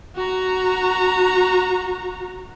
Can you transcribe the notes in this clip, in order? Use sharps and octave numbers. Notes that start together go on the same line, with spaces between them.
F#4 A#5